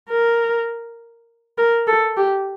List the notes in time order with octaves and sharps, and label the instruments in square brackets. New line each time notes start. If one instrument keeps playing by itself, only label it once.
[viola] A#4
A#4
A4
G4